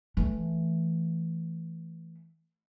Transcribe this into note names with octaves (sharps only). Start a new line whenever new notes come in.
E3 A3